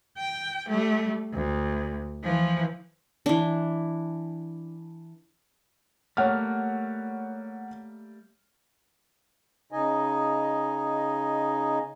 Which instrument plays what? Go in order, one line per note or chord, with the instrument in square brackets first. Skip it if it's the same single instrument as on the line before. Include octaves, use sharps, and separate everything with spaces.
[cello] G5
G3 A3
D2
E3 F3
[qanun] E3 D4
[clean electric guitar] G3 A3 A#3 [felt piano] C#5 F#5 F6
[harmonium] C#3 D#4 D#5 G#5